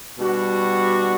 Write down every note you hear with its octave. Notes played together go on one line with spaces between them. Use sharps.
B2 G3 D4 F#4